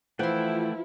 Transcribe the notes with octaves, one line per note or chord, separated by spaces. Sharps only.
E3 F3 A3 E4 F4 F#5 G5 C6